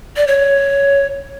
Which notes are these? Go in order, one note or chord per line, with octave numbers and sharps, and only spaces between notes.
D5
C#5